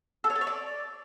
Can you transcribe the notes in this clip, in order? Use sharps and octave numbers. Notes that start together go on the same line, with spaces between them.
A4
C#5
A4
C#5
D5